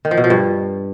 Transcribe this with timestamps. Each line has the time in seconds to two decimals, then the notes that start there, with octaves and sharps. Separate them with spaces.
0.05 D#3
0.11 F3
0.17 B2
0.24 F3
0.30 G2